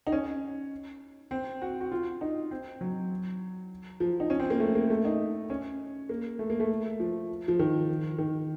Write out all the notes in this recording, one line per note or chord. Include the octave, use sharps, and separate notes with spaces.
D#4
C#4
C4
F#4
F#4
F4
D#4
C4
F#3
F3
D#4
C#4
C4
A#3
A3
A#3
A3
D#4
C#4
A#3
A3
A#3
A3
F3
F3
D#3
D#3